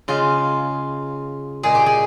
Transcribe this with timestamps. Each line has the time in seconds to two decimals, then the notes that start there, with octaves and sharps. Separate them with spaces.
0.08 C#3 G#3 F4
1.63 A#2 G#3 G#4
1.75 G4
1.86 G#4